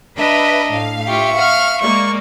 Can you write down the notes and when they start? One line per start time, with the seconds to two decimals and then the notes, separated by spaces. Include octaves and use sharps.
0.17 D4 B4 D#5 E5 A#5
0.70 A2 F5
1.07 F4 G4 E5 C#6
1.36 F5 F#5 F6
1.81 G#3 A#3 D5 C#6